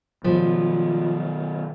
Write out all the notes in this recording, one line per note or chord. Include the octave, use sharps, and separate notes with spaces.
B2 D#3 F3